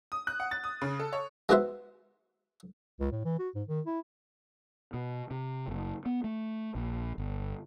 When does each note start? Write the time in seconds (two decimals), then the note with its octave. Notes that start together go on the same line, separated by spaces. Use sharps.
0.12 D#6
0.27 F#6
0.40 F#5
0.51 A6
0.64 D#6
0.82 C#3
1.00 A4
1.13 C#5
1.49 G#3 B3 D#4 F#4 C5 E5
3.00 C#2
3.12 A2
3.25 E3
3.39 F#4
3.55 G#2
3.68 D#3
3.87 E4
4.94 B2
5.31 C3
5.68 F#1
6.06 B3
6.24 A3
6.75 A#1
7.18 G1